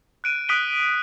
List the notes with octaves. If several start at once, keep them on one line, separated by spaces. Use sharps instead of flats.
F#6 D7 D#7
D#6 F#6 B6 D7 D#7 G7